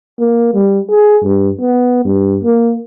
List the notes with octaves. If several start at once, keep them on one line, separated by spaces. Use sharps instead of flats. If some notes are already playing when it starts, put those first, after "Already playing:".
A#3
G3
G#4
G2
B3
G2
A#3